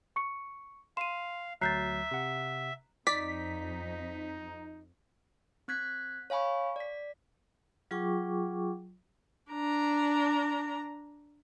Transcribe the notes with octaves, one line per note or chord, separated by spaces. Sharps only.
C#6 C#7
F5 C6 D#7 E7
D2 F#3 E5 A#5 F#6 G6 A6 C7
C3 F#5
F2 D#4 D5 B6
C4 F#6 G#6 B6
C#5 F5 G#5 B5 C#6
D5 B6
F#3 F4 G#4 G5 C#6 D6
D4 A#5